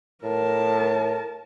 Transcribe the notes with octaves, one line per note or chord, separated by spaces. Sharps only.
A2 A#4 A5